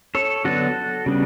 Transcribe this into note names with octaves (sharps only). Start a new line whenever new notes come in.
A4 C#5
D3 F#3 B3 D4 F#4 A4
C#3 G3 B3 D4